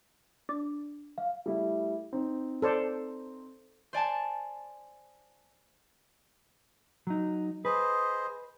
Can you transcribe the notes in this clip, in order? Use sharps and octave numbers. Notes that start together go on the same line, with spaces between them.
D4
F5
G3 A3 E4
C4 D#4
A4 C5 D5
C5 D5 G#5 A5
F#3 D#4
G#4 B4 C5 D#5